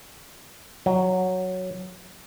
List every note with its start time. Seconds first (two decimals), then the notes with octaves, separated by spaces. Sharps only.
0.86 F#3